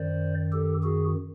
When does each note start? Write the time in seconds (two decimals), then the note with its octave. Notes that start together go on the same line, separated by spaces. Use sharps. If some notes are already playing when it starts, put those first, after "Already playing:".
Already playing: F#2 D#3 C5 D5
0.52 G4 A4
0.83 F#4 G#4